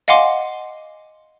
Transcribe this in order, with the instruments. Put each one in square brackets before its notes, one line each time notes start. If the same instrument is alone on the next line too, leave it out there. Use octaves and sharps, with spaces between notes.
[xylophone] D#5 F5 F#5 G#5 C6 D6